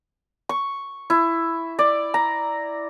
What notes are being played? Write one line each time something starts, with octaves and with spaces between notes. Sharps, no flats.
C#6
E4
D5
A#5